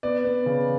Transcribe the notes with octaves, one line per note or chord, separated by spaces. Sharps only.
B3 D5
B3
C#3